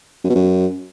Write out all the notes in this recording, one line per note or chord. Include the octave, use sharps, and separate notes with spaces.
F#2
B2
F#2